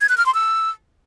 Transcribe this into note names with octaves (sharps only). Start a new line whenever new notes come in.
G#6
F#6
F6
C6
E6